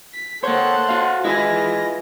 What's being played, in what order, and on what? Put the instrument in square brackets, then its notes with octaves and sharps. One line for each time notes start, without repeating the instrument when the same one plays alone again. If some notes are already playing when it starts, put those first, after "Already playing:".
[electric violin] B6
[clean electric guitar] A#3 C#5 [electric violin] A4 F#5 [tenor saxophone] C5
[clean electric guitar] F#4 F5
[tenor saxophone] G#3 [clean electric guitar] E4 B4 G#5 [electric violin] F4 A#6